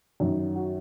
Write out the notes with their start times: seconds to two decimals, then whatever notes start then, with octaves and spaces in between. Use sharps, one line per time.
0.20 F#2 D#3
0.56 F#4